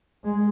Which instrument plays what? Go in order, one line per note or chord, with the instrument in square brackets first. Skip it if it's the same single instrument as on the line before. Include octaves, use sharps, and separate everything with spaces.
[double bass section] G#3